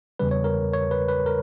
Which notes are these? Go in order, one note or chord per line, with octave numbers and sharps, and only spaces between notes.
E2 C#3 G3 B4
C#5
A#4
C#5
B4
B4
A#4